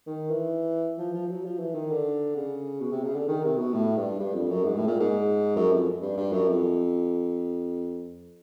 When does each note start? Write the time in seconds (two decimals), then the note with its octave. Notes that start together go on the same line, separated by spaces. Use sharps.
0.07 D#3
0.30 E3
0.99 F3
1.14 F3
1.29 F#3
1.45 F3
1.59 E3
1.74 D#3
1.91 D3
2.36 C#3
2.80 B2
2.91 C3
3.04 C#3
3.15 D3
3.28 D#3
3.43 C3
3.58 B2
3.74 A2
3.97 G2
4.20 G2
4.34 F2
4.50 F#2
4.65 G#2
4.77 A2
4.87 A#2
5.00 G#2
5.56 F#2
5.72 F2
6.02 G2
6.17 G2
6.32 F#2
6.48 F2